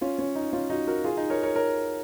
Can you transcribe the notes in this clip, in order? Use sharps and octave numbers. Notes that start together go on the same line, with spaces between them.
C#4 F4
C#4
D#4
C#4 F4
D#4 F#4
F#4 A#4
F4 G#4
D#4
A#4 C#5
A#4 C#5
A#4 C#5